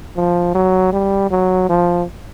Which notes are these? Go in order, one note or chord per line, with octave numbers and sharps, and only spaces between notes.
F3
F#3
G3
F#3
F3